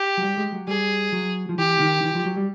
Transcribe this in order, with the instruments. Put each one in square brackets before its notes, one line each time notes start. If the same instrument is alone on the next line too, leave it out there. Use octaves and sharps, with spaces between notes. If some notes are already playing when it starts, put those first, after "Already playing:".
Already playing: [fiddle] G4
[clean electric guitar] F#3
G3
G#3
F#3
[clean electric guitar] G3 [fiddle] G#4
[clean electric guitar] F#3
F3
[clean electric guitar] E3 [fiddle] G4
[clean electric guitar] D#3
E3
F3
F#3
G3